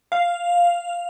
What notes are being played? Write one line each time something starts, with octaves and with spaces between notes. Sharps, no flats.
F5